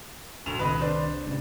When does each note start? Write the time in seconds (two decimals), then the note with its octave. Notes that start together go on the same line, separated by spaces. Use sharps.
0.46 D2 G2 A#2 E7 F7
0.59 C2 D#3 B4 D#5
0.81 D4 C5
1.24 C#2 A2